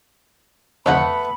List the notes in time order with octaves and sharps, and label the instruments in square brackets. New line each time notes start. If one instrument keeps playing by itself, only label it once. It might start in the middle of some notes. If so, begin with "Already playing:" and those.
[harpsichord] F2 D3 [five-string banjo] A3 B3 F#5 [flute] B5